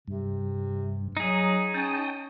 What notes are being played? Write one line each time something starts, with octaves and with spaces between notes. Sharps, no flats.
G2 C3
F#3 D#4 G#4
C#4 G5 A5 D#6